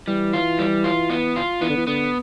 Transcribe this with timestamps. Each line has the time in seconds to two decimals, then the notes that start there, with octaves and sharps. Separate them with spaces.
0.07 E3 G3
0.33 F4
0.59 G3
0.84 F4
1.10 B3
1.36 F4
1.61 E3 B3
1.70 D3
1.77 E3
1.87 D3 B3